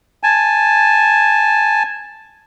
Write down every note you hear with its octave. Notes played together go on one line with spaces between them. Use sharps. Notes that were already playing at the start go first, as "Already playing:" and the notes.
G#5 A5